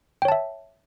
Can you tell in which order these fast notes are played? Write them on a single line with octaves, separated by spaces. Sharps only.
G5 C#5 A5 E5